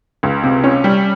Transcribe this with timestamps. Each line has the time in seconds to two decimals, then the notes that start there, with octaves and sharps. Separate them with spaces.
0.23 C#2
0.43 C3
0.64 C#4
0.84 G3